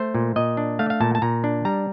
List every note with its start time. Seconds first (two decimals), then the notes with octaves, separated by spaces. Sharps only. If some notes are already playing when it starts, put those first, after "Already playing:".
Already playing: A3 C5
0.15 A#2
0.36 A#2 D#5
0.57 D4
0.79 A3 F5
0.90 F5
1.00 A#2 A5
1.15 A5
1.22 A#2 A#5
1.44 D4
1.65 G3 A#5